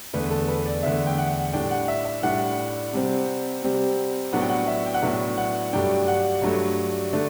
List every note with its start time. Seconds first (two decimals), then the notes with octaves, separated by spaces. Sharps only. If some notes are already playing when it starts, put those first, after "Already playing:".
0.13 E2 D3 A3 B4
0.31 A4
0.48 B4
0.66 D5
0.83 E2 D3 A3 E5
1.07 G5
1.18 F#5
1.53 A2 G3 D4 G5
1.71 F#5
1.88 E5
2.05 E5
2.23 A2 G3 D4 F#5
2.93 C3 G3 C4
3.63 C3 G3 C4
4.33 A2 F#3 B3 D4 F#5
4.41 G5
4.49 F#5
4.67 E5
4.86 G5
4.94 F#5
5.02 A2 F#3 B3 D4 E5
5.37 F#5
5.73 G2 F#3 A3 D4 G5
6.08 F#5
6.42 G2 F#3 A3 D4
7.13 D3 A3 D4